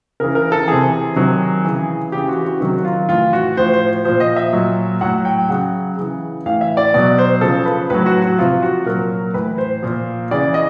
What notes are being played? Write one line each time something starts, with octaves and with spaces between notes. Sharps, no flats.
C#3 E3 A#4
A#4
A4
C3 E3 G#4
C3 D#3 F#3
C#3 E3
C#3 E3 G4
F#4
F#4
C3 D#3 F#3 F#4
F#4
F4
A2 E3 F4
F#4
A2 F3 C5
C5
A#2 F3 C5
D#5
E5
A#2 F#3
A2 F#3 F#5
G5
C#3 F#3 F#5
C#3 E3
A2 E3 F5
E5
D5
B2 F#3 D5
C5
C#3 F3 A4
B4
A2 F#3 B4
F#4
F#4
C3 F3 F4
F#4
A#2 F#3 A#4
A2 E3 B4
C5
A#2 F3
C#3 E3 D5
D#5